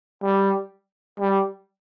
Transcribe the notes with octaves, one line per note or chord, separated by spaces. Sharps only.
G3
G3